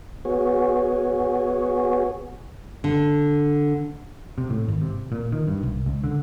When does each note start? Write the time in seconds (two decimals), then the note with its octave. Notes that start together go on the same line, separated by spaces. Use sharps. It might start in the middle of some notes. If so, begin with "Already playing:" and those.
0.25 B3 F#4 G#4 C#5
2.84 D3
4.38 C3
4.50 A2
4.68 G#1
4.82 C3
5.12 A#2
5.32 D#3
5.47 G2
5.63 C2
5.86 C#2
6.04 D3